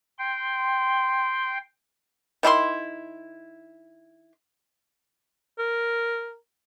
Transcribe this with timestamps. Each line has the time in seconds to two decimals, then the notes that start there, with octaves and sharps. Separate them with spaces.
0.19 G5 C6
2.43 D#3 E4 G#4 C6
5.59 A#4